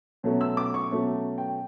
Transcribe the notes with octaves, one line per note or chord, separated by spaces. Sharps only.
B2 F#3 A3 C#4
E6
D6
C#6
B2 F#3 A3 C#4
G5